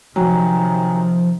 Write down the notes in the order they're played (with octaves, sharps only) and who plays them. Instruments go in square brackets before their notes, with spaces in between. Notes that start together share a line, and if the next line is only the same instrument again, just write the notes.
[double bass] C3 D#3 [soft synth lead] F3 [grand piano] F#3 [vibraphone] G5 G#5 A#5